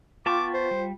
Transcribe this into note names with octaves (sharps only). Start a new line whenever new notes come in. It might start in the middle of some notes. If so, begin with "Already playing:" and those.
B3 F4 G5 A5 C#6 D6
C5
G3